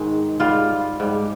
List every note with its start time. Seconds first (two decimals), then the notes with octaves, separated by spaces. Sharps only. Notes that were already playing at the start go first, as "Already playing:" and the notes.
Already playing: G#2 D#3 G#3
0.40 G#2 G3 F4
1.00 G#2 G3